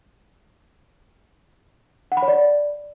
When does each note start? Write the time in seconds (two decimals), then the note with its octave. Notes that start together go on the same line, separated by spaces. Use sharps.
2.12 F#5
2.17 B5
2.22 C#5
2.28 D5